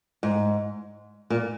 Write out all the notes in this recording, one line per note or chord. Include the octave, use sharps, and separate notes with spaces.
G#2
A#2